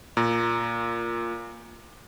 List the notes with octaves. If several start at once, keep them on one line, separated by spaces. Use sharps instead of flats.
A#2 A#5